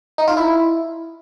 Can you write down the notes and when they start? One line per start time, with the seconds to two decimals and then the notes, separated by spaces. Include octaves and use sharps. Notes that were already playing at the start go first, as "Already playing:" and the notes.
0.18 D#4
0.28 F4
0.37 E4